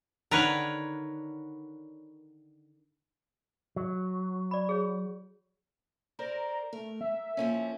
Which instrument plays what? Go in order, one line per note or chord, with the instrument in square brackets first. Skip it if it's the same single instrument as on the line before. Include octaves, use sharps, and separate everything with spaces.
[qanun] D3 D#3 [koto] A#4 B4 C#5
[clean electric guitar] F#3
[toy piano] D5 B5
G#4 C#5
[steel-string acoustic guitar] A#4 C5 D5 [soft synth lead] A#5
[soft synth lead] A3 [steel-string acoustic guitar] A#4
[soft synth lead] E5
[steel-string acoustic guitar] F3 A#3 C#4